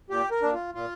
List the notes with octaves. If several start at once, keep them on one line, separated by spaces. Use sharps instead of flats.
A#2 G4
A#4
A#3 D4
F4
A#2 F4